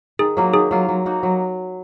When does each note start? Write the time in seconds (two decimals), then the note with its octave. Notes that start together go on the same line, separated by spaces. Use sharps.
0.19 D#3 G#4
0.37 F#3 A#3 F4
0.54 D#3 G#4
0.71 F#3 A#3 F4
0.89 F#3
1.06 A#3 D#4 F#4
1.23 F#3